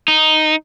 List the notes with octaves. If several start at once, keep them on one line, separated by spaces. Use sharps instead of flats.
D#4